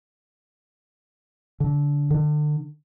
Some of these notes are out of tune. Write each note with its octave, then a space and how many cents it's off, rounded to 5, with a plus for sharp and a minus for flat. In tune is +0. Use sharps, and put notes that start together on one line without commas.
D3 -20
D3 +35